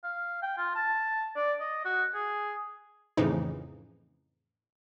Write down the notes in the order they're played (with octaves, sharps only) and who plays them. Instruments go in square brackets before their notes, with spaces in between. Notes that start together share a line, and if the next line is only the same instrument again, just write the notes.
[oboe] F5
G5
F4
A5
D5
D#5
F#4
G#4
[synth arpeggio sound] F2 A2 C#3 E3 F3 D#4